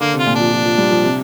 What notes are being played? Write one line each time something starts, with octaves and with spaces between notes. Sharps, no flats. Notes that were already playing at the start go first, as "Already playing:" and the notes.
D3 A#3
C3
F4
A#2
F3 D4
F3
F3
G3
F3
C3